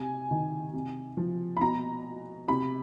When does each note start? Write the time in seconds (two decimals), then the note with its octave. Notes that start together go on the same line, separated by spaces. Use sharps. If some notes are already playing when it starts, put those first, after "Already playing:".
Already playing: C3 G#5
0.31 D#3
0.73 C3
1.17 F3
1.57 B5
1.61 B2 A#5
2.48 C3 B5